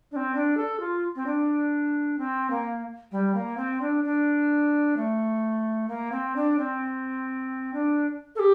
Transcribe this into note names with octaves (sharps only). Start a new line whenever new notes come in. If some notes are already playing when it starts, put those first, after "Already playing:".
D4
C4
D4
A4
F4
C4
D4
C4
A#3
G3
A#3
C4
D4
D4
A3
A#3
C4
D4
C4
D4
A4
G4